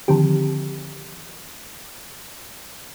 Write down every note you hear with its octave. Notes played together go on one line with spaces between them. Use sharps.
D3 D#3 F3 C4 G4